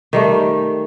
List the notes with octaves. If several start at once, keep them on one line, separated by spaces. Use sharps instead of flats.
D#3 G3 A3